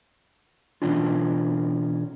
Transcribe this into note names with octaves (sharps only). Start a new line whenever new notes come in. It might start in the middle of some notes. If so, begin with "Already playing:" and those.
B2 D#3 E3 C#4 D4 F4